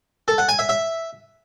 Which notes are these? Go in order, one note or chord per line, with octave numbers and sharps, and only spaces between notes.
A4
F#5
G#5
E5
E5